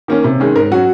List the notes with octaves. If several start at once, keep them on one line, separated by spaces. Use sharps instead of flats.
D#3 A#3 C#4
C3
D#3 G#3 C#4
G#2 A#4
F#3 C#4 F#4